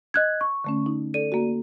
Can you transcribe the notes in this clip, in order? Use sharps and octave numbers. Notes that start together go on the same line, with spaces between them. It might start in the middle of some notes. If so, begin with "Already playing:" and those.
D#5 F#6 G#6
C#6
D3 A3 C#4
D#4
A4 D5 D#7
A#3 F#4